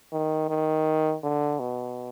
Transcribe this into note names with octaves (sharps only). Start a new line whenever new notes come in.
D#3
D#3
D3
B2